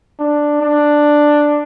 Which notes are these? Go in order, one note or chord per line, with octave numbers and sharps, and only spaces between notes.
D4
D4